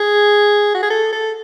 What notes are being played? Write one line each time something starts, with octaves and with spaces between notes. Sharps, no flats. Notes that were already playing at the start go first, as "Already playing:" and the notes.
Already playing: G#4
F#4
G#4
A4
A4